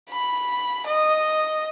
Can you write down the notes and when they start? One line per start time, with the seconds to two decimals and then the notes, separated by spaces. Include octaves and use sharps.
0.10 B5
0.86 D#5